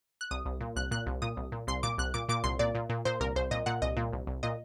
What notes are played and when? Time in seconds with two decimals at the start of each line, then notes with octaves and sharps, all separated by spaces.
0.21 F#6
0.31 C2 D#6
0.46 C2
0.61 A#2
0.76 C2 F#6
0.91 A#2 F#6
1.06 C2
1.22 A#2 D#6
1.37 C2
1.52 A#2
1.67 C2 C6
1.83 A#2 D6
1.98 C2 F#6
2.14 A#2 D6
2.29 A#2 D6
2.44 C2 C6
2.59 A#2 D5
2.75 A#2
2.90 A#2
3.05 A#2 C5
3.20 C2 A#4
3.36 C2 C5
3.51 A#2 D#5
3.66 A#2 F#5
3.82 C2 D#5
3.97 A#2
4.13 C2
4.27 C2
4.43 A#2 D#5